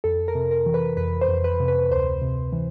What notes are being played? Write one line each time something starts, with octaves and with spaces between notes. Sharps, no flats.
F2 A4
A#4
C3
A#4
E3
B4
F2 B4
C5
F2
B4
C3
B4
D2 C5
C3
E3